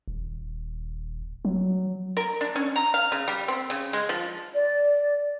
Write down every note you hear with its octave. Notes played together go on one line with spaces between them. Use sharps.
D#1
F#3
A#4
D4
C#4
A#5
F5
C#3
G3
C4
C#3
G#3
F3
D5